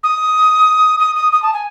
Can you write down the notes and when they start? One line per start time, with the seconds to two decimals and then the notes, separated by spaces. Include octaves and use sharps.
0.03 D#6
1.00 D#6
1.16 D#6
1.32 D#6
1.42 A5
1.53 G#5